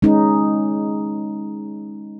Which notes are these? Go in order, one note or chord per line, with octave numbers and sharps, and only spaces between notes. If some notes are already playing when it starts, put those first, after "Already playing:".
G#3 C#4 D#4